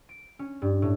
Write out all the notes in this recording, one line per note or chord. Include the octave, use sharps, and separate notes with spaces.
D7
C#4
G2
A2